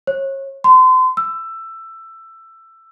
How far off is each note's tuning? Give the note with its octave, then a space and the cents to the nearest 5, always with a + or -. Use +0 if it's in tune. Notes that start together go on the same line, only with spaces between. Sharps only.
C#5 -35
C6 -35
E6 +15